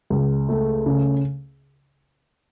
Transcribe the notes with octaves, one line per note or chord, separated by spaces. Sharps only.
C#2
A3
C#3